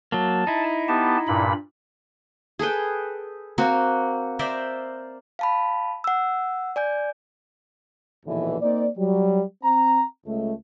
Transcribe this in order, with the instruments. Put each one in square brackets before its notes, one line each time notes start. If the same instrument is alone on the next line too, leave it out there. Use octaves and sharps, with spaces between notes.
[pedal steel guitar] F#3 A#3 [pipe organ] A5
[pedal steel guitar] D#4 E4
[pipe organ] B3 G4 A5
G2 A#2 B5
[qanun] G#4 A4 B4 G5
A#3 C4 F#4
A#4 C5 D5 E5
[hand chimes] F5 A5 B5
F#5 E6
D5 G#5 G6
[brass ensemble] A#1 D#2 B2 D3 E3
A#3 C4 D#4 D5
F#3 G3
C4 A#5
C#2 A3